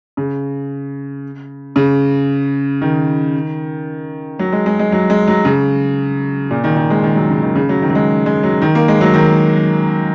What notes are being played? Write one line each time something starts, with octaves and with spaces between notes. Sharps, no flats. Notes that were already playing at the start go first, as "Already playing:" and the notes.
C#3
C#3
D#3
F#3
G#3
G#3
G#3
F#3
G#3
F#3
C#3
A#2
D#3
D#3
G#3
D#3
F#3
C#3
D#3
C#3
F#3
D#3
F#3
G#3
G#3
F#3
D#3
A#3
G#3
F#3
D#3